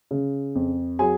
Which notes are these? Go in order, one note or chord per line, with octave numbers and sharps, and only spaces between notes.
C#3
F2
F#3 G#4 G#5